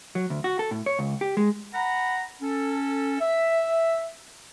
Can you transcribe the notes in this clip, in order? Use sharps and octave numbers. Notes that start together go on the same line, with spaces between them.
F#3
D2
F#4
A4
A2
C#5
C#2
G4
G#3
F#5 A#5 B5
C#4 A4
E5